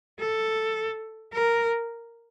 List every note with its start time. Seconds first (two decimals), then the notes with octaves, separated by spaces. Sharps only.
0.19 A4
1.33 A#4